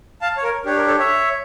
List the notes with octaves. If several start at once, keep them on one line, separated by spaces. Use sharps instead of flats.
F5 A5
C#5
A#4
D4 G4 C#5
A#4
A4 C#5
C#5 E5